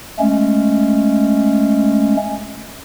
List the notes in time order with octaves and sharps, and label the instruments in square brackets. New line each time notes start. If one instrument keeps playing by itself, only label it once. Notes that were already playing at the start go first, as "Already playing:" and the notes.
[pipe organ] G#3 A3 C#4